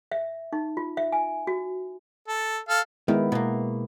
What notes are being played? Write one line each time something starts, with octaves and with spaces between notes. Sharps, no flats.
E5
D#4
F4
E5
G#5
F#4
A4
A4 F5
D#3 G#3 B3 E4
B2 A#3